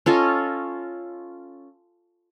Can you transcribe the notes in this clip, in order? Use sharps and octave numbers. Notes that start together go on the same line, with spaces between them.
C#4 F4 A4 D#5